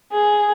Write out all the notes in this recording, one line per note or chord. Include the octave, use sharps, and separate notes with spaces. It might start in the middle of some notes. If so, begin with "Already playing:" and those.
G#4